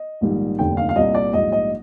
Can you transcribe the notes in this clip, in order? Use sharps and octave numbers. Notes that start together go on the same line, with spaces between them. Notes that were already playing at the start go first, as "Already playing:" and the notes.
Already playing: D#5
A#1 G#2 D#3 G3
F1 D#2 D3 G3 G5
F5
F5
C2 A#2 G3 D#5
D5
A#1 G#2 G3 D#5
D#5